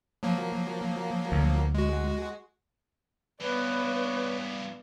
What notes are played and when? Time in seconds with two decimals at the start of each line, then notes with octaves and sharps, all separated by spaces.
0.23 F3 F#3 A#3
1.32 D2
1.74 G#3 F#4
3.41 G2 E3 B3 B4 C#5 D5